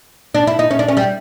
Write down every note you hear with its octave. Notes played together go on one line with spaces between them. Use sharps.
D4
E4
D#4
C#4
D4
C#4
G3